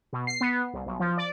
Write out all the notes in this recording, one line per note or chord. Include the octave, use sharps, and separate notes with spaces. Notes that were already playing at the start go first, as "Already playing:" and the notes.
B2
C7
B3
C2
B1
F3
D5